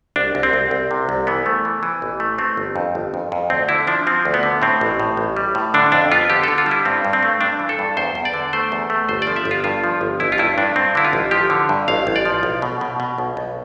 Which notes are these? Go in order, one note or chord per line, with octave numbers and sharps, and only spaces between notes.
C2 D4
C2
C4
C2
C2
C3
C2
E3 B3
A3
E3
E3
A1
A3
A3 C4
G1
F2
G1
F2
F2
D2 C4
D3 E4
F3 D4
F3 C4
D2
B3
D3
A2 C4
A1
A2
A1
G3
A2
D3 D4
F2 D4
B3 F4
D3 G4
D3 A4
F4
G3
E4
G2 C4
G2
C4
A3
G2 D4
E3
A4
G2
E2 C5
E2
D5
D3
A3 C5
E2
A3
G1 C5
D5
F3
E5
G1
F4
G2 F4
F3
G1
A1 E4
F4
G2 E4
G2 D4
G2 C4
D3 E4
F4
A1
F3 G4
D3
G2
A1 F5
A1
D5
F3
B1
B2
B2
B2
B1
B1